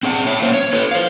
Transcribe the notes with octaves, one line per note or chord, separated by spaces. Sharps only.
C4 G#4 F#5
C#5 E5 A5
A#3 C#4 C5
C#5
E4 A4 B4
C5 F5